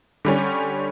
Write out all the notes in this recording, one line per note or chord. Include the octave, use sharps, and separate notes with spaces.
D3 G3 C#4